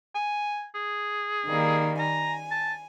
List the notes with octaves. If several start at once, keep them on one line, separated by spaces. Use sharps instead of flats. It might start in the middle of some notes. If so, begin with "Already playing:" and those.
G#5
G#4
D#3 G3 A#3
G#5 A#5
A5